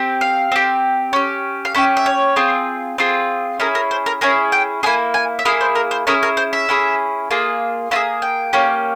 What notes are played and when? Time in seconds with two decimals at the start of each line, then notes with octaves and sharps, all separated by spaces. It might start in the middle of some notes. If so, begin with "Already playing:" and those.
Already playing: C4 G4
0.21 F5
0.52 C4 G4
1.13 C#4 G4
1.65 F5
1.75 C#4 G4 E5
1.97 E5
2.06 C#5
2.36 C4 F4 G#4
2.98 C4 F4 G#4
3.60 C#4 E4 G#4 A#4
3.75 A#4
3.91 C5
4.06 A#4
4.21 C#4 E4 G#4 A#4
4.52 G5
4.83 A#3 E4 G#4 G#5
5.14 G#5
5.39 E5
5.45 A#3 E4 G#4 F5
5.61 C5
5.75 A#4
5.91 C5
6.07 C#4 E4 G#4 A#4
6.23 A#4
6.37 C5
6.53 E5
6.69 C#4 E4 G#4
7.31 A#3 F4 G#4
7.91 A#3 F4 E5
7.96 G#4
8.22 G5
8.53 A#3 C#4 G4